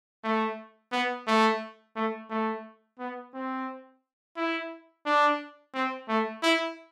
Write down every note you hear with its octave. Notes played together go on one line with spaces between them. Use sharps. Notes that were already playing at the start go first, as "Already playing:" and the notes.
A3
B3
A3
A3
A3
B3
C4
E4
D4
C4
A3
E4